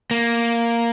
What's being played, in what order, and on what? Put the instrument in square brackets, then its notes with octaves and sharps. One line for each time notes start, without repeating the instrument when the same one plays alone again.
[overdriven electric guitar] A#3